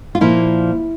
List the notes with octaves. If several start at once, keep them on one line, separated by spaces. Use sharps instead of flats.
F4
A#2 F3 A#3 E4